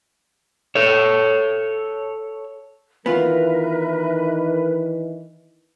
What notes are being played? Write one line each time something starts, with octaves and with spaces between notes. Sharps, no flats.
A4 C#5
D#3 E3 B3 F4 A#4 B4 E5